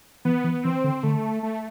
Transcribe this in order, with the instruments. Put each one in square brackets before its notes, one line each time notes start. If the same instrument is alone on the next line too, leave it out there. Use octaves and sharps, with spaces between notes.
[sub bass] E3 [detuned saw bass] B3
[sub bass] E3
[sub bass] E3 [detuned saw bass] C4
[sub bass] D3
[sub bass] D3 [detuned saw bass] A3
[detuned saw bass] A3